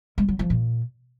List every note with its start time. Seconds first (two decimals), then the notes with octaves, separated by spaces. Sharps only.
0.18 G#3
0.28 F#3
0.39 F3
0.50 A#2